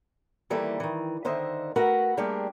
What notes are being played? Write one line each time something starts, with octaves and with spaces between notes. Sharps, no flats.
D#2 E3 G3 A#3 A4
D#3 E3
D3 D#3 C5 D#5 E5
A3 F#4 A#4 B4 F#5
G3 A3 A#3 D4 G4 G#4